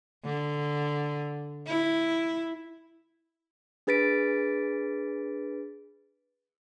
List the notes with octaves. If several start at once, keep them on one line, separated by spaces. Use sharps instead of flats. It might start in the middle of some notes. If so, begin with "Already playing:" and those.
D3
E4
D4 G#4 B4 A6 B6 D7